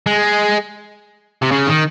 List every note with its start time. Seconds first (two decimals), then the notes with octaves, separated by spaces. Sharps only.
0.07 G#3
1.42 C3
1.51 C#3
1.67 D#3